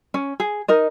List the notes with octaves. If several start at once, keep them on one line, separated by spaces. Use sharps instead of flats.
C#4
G#4
D#4 A#4 D#5